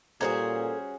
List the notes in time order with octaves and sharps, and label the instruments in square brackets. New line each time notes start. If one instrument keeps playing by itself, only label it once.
[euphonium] A#2 [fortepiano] G3 C5 A#5 [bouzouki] C#4 F#4 G#4 [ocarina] A4